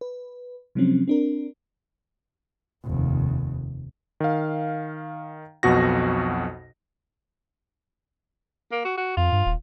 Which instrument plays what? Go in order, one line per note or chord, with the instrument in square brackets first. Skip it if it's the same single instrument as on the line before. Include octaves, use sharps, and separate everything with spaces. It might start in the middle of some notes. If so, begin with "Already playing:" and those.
[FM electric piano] B4
C3 F3 F#3 G#3 C4 C#4
C4 D4 A#4
[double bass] F1 D#2
[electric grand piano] D#3 F5
B1 F2 B2 F#4 A#6
[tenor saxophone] A#3
F#4
F#4
[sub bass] F2 [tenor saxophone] F4
[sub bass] G2
D#1